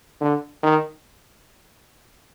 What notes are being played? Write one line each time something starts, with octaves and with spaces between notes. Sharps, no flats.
D3
D#3